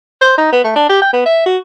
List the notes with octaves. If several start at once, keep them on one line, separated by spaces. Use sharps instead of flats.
C5
D#4
B3
A3
D4
G4
G5
B3
E5
F#4